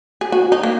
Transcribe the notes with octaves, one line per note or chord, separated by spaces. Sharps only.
G#4
F#4
D#4
A#3